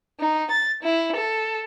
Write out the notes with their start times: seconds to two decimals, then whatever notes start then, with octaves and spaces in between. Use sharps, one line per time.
0.20 D#4
0.51 A6
0.83 E4
1.17 A4